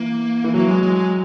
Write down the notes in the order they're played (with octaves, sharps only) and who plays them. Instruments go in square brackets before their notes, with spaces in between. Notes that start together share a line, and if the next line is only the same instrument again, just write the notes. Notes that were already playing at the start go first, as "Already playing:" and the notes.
Already playing: [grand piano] E3 [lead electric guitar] A#3
[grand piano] E3
[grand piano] F#3 [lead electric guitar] A#3
[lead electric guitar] G#3
G#3
G#3